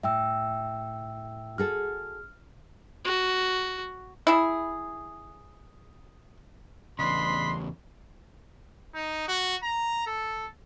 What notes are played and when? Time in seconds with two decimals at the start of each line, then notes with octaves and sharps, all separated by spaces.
0.03 A2 E5 G5 E6
1.58 F#4 G#4 A4 F6
3.05 F#4
4.27 E4 G#4
6.99 E2 G2 C#3 D4 D#5 B5 C6
8.94 D#4
9.28 F#4
9.63 A#5
10.07 A4